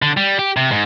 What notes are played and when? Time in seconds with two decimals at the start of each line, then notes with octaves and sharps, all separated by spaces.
0.02 D3
0.17 G3
0.39 G4
0.57 C3
0.71 G#2